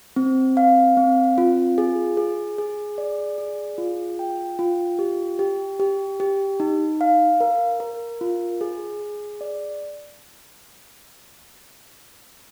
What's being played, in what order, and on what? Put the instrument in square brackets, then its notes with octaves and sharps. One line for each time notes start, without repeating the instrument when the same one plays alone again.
[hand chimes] C4
F5
C4
F4
G#4
G#4
G#4
D5
G#4
F4
G5
F4
G4
G4
G4
G4
D#4
F5
A#4
A#4
F4
G#4
G#4
D5